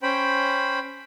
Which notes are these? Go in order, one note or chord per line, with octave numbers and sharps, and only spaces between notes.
C#4 C5 G5 B5